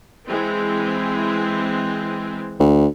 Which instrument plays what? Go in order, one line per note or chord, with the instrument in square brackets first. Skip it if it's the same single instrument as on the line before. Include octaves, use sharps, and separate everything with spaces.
[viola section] E3 G#3 C4
[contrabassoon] D2